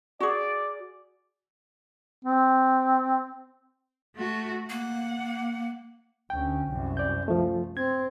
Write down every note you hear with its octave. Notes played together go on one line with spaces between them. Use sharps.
F#4 G#4 D5
C4
A3 F#4
A#3 F#5
D2 C#4 G5
C2 F#2
D5 G6
F3 A3
C4 G#6